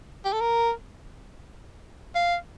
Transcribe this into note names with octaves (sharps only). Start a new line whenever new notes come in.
G4
A4
A#4
F5